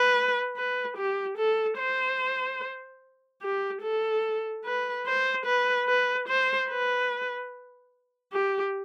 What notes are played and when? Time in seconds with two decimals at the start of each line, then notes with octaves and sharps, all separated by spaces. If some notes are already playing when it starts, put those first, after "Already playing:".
Already playing: B4
0.57 B4
0.97 G4
1.38 A4
1.78 C5
3.42 G4
3.82 A4
4.65 B4
5.06 C5
5.46 B4
5.88 B4
6.28 C5
6.69 B4
8.33 G4